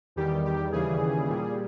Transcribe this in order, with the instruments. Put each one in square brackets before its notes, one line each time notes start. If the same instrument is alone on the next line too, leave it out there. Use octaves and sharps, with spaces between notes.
[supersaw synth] E2 D#3 G3 G4
G4
D#2 C#3 E3 G3 G#4
A#2 G3